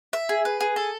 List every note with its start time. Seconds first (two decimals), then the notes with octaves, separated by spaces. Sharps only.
0.13 E5
0.29 G#4
0.45 B4
0.60 G#4
0.76 A4